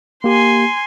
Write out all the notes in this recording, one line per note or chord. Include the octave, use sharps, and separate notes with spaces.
A#3 G4 G#5 C6